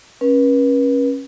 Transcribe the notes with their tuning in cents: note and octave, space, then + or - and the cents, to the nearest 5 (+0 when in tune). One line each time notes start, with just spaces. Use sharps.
C#4 -20 B4 -40